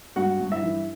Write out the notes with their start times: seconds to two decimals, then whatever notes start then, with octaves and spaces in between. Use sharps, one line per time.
0.16 G2 F#4 F#5
0.40 G2
0.52 E4 E5
0.63 E3